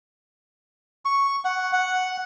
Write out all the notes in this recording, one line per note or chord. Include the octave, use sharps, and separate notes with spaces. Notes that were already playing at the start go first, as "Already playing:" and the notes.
C#6
F#5
F#5